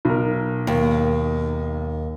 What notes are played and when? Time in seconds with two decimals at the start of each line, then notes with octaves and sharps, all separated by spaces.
0.05 B1 A#4
0.67 D#2